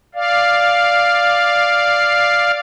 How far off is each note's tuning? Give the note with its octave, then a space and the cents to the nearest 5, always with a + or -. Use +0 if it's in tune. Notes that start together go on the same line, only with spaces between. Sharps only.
D5 +0 F5 +0